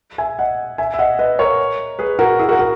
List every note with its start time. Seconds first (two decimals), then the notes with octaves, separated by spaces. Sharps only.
0.18 E5 G#5
0.39 D#5 F#5
0.78 E5 G#5
0.94 E5
0.99 D#5 F#5
1.19 B4 D#5
1.39 A#4 C#5
1.99 G#4 B4
2.19 F#4 A#4
2.39 E4 G#4
2.49 F#4 A#4
2.59 F#4 A#4